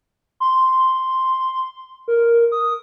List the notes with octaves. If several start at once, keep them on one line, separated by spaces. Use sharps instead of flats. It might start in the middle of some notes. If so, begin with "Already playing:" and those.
C6
A#4
D#6